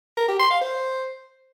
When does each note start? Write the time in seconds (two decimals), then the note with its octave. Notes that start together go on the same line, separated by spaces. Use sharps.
0.17 A#4
0.28 G4
0.39 C6
0.50 F5
0.61 C5